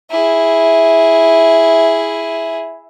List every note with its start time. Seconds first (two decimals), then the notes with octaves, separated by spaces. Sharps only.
0.10 E4 G#4